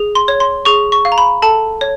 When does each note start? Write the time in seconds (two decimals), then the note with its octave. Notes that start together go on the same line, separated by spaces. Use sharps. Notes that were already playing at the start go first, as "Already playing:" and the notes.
Already playing: G#4
0.15 C6
0.28 C#5
0.40 C6
0.65 G#4 C#6
0.92 C#6
1.05 F5
1.12 A#5
1.18 B5
1.42 A4 A5
1.81 C#5